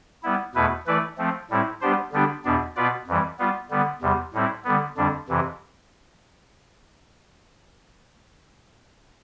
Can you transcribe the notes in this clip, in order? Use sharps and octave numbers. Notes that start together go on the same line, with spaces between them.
G3 B3 E4
E2 B2 A3 E4 B4
E3 A3 E4 B4 D5
F3 A3 C4
A2 G3 C4 E4
G3 B3 D4 G4 C5
D3 G3 B3 D4 G4
E2 B2 B3 D4
B2 B3 F4 B4 D5
F2 E3 G3
G3 B3 F4
D3 G3 B3
E2 C3 G3
A2 G3 C4 E4
D3 G3 B3
F2 D3 G3 D4
F2 C3 E3